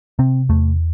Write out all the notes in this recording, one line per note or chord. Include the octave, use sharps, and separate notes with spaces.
C3 C4
E2 A3